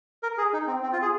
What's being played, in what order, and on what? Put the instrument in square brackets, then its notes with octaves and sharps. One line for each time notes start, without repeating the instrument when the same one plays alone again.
[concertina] A#4
G#4
D#4
C4
C4
F4
G#4